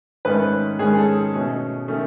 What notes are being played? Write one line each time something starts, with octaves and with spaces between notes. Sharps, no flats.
G#2 D#3 A3 C#4 B4
G#2 D#3 G#3 C#4 G#4
A4
B2 A3 C#4
D#3 A3 C#4